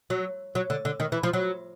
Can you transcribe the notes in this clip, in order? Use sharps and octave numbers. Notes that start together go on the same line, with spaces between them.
F#3
F#3
D3
D3
D#3
E3
F3
F#3